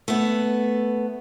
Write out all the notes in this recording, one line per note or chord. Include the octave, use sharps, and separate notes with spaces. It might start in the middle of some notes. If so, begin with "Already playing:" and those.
A3 B3